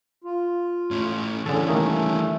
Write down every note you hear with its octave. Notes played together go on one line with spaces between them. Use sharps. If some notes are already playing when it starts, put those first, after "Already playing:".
F4
A2 C#4
D3 E3 G3 C#4 G#4 A4
D#3 A3 A#3